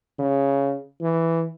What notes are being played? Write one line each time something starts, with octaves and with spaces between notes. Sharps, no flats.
C#3
E3